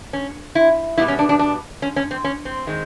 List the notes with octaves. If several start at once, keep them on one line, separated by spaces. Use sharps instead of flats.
C#4
E4
B2 G3 B3 E4
C#4
D4
D4
D4
C#4
C#4
C4
C#4
C4
D#3 G#3 C4